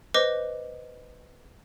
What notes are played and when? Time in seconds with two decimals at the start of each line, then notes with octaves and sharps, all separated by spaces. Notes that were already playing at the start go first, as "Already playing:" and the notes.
0.14 B4 C5 D#5 D6